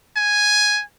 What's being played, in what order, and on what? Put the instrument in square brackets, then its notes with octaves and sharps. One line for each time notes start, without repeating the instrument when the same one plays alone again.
[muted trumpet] G#5